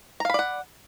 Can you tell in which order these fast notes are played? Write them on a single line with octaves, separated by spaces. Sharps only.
A#5 F5 B5 D5 F#5